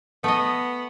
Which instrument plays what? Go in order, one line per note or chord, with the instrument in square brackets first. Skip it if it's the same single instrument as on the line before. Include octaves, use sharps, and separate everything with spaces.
[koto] A3 D#5 [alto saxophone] B3